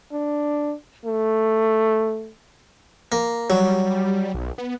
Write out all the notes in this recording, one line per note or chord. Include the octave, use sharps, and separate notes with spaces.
D4
A3
A#3
F#3 G3
B1
B3